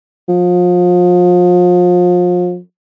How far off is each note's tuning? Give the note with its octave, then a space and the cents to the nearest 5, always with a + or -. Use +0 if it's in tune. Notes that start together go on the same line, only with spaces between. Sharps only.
F3 +35